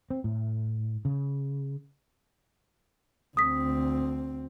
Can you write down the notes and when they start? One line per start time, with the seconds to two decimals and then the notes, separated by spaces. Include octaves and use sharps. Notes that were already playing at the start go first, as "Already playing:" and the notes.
0.10 C4
0.24 A2
1.05 C#3
3.37 D2 C4 D#6 B6